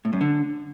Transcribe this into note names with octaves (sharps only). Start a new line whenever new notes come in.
A2
F#2
D3